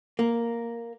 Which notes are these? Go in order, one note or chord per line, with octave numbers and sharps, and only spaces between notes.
A#3